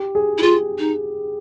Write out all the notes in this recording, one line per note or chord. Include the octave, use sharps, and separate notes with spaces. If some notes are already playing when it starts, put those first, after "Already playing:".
Already playing: G4
G#4
E4
F4 G#4
D#4